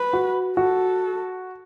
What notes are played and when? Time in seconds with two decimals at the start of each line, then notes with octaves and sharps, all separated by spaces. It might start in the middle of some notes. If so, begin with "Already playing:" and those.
Already playing: B4
0.13 F#4
0.57 F#4 A4